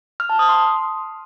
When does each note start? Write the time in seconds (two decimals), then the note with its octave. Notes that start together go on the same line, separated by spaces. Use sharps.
0.20 F6
0.29 A5
0.39 D#6
0.49 C6